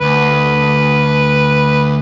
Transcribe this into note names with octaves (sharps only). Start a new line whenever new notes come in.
D2 B4